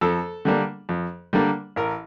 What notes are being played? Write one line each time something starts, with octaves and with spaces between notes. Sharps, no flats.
F2 A4
D3 G3 A#3 D4
F2
D3 G3 A#3 D4
A1 A#4